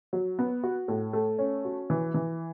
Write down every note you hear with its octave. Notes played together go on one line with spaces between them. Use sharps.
F#3
B3
F#4
A2
A3
C#4
F#4
E3
E3